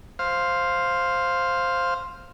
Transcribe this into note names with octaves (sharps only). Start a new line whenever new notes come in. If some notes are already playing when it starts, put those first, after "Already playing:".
C5 F5